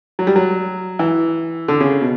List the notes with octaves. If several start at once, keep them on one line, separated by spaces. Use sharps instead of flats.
F#3
G3
F#3
E3
D3
C#3
B2